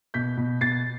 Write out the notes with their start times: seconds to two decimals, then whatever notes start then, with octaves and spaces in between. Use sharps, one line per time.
0.14 B2 G6 B6
0.37 B2
0.61 B2 A6 C7